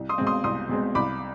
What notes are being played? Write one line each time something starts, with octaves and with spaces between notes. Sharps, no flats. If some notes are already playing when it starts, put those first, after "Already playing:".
Already playing: C2
C6 D#6
B2 G#3 C4
C6 D#6
C2 C6 D#6
B2 G#3 C4
C2 B5 D6